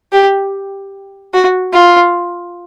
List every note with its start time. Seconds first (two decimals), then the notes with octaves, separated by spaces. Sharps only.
0.12 G4
1.33 F#4
1.73 F4